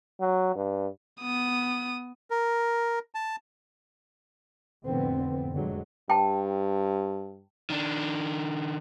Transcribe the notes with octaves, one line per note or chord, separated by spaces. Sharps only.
F#3
G2
B3 D#6
A#4
A5
F1 A2 D3 B3 C4
F1 F2 A2 D3 F#3 G#3
G2 G5 A5
D#3 D4